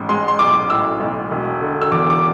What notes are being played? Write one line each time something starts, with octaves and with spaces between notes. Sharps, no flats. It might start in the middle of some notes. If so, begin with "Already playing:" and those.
Already playing: A1 G#2
G#3 C6
C6
B1 D6
A2 E6
B1
E1
D3
E6
E2 D6
D6